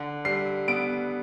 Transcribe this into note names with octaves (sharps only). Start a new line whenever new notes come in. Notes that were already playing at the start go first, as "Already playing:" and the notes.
Already playing: D3
G3 C7
B3 D7